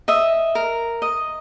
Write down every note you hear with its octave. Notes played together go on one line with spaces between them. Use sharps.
D#5 E5
A#4
D#5